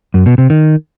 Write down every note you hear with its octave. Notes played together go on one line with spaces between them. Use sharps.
F#2
B2
C3
D#3